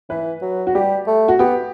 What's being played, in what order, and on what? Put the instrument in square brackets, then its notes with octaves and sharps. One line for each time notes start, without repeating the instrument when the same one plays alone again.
[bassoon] E3 [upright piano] B4
[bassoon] F#3
[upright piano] F#4
[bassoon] G3 [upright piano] G4
[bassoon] A3
[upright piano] F#4
[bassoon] B3 [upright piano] G4